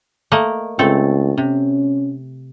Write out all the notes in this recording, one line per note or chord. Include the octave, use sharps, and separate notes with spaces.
A3 A#3 D#5
C#2 A3 C4 A4
C3 C#4